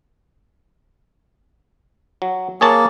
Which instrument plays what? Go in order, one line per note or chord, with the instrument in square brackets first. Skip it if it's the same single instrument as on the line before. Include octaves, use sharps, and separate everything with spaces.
[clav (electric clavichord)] F#3
[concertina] A#3 [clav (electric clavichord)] G#4 C#5 A5